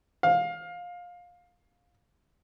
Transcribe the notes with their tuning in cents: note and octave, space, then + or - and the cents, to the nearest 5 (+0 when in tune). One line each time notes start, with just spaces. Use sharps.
F5 +20